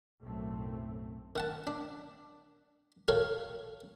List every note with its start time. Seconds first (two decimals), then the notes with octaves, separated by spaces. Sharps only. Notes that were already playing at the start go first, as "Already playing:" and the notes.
0.22 B1 F#2 A2 A3 C4
1.36 D#3 F#5 A5
1.67 D4
3.08 F#4 A4 A#4 C#5 F5